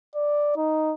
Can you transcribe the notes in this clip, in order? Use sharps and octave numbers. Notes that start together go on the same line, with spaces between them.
D5
D#4